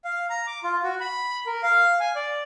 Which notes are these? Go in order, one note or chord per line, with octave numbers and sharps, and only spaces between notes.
F5
A#5
D6
F4
F#4
B5
A#4
F5
G#5
D5